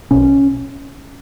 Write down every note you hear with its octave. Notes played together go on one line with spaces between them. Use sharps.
B1 B2 C#4